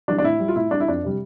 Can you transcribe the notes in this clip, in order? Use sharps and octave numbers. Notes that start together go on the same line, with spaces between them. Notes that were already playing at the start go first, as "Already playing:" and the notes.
E3 G3 D4
D4
A2 E4
G3
F4
A2 E4
G3 D4
E4
F2 D4
C3 G3